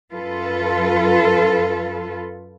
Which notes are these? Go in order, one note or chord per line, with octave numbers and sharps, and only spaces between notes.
F#2 F4 A4 B4